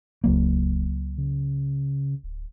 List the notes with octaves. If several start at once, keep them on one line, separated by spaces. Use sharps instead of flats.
D#1 C#2 F#3 A#3
C#3
D1